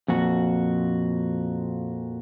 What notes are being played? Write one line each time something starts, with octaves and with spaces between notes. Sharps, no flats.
F2 A#2 F#4